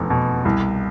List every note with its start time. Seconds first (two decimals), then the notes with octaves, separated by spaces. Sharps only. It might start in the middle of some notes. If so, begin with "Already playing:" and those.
Already playing: F1 E2 B2
0.10 B2
0.45 C2